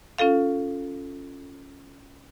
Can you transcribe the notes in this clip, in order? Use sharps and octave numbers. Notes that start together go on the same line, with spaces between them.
C#4 F4 A4 F5